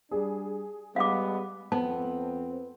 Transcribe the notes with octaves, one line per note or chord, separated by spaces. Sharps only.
G3 D4 G#4
G3 G#3 B3 F5 F#5 D6
F2 B3 C4 A5